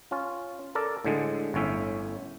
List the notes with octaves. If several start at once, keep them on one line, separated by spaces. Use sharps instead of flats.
C#4 F4
A4 A#4 D5
A2 D3 G#3
G1 A2 C#4 E5